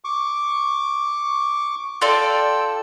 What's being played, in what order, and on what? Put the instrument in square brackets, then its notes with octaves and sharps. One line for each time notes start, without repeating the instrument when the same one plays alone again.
[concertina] C#6 D6
[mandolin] F4 A4 D5 [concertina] G5 E6